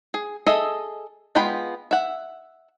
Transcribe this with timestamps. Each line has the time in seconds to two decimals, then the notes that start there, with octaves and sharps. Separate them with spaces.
0.14 G#4
0.46 G#4 A4 D#5 E5
1.35 G#3 B3 F4 G5 B5
1.91 E5 F#5